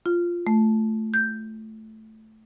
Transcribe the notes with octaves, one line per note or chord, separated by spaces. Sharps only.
F4
A3
G6